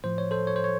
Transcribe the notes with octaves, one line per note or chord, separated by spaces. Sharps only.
A2 F3 C5
C#5
A4 C5
C#5
C5
C#5